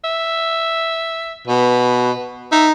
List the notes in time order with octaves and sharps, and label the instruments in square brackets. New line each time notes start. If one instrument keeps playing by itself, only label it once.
[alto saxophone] E5
[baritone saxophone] B2 [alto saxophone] B4
[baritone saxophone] D#4 [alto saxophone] E5